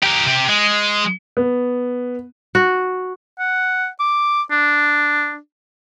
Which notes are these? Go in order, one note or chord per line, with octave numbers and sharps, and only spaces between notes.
G4 A#4
C3 G4
G#3
B3
F#4
F#5
D6
D4